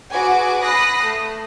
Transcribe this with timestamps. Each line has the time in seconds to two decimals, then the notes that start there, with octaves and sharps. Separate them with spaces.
0.12 F#4 G#4 B4 G#5 D6
0.63 B5 D#6 F#6 A#6 C7
1.03 A3